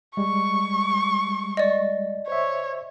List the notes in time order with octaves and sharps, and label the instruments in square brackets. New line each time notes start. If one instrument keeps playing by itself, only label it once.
[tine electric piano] G3 G#3 [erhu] C#6
[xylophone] D5 D#5
[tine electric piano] C5 E5 [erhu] C#5